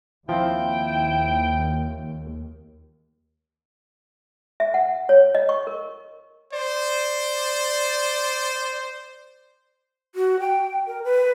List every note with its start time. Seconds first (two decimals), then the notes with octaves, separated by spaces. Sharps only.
0.29 D#2 F3 C4 E4 G5
4.60 E5
4.74 F#5
5.09 C#5
5.35 D#5
5.49 C#6
5.67 A#4
6.53 C5 D5
10.15 F#4
10.40 G5
10.87 A#4
11.04 B4